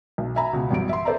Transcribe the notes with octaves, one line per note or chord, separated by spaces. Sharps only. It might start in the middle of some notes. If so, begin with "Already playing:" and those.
B1
E5 G#5 A#5 B5
C#2 B2
A1 F#2 G3 D7
E5 C6
A4 B4 C5 D5 E5 A#5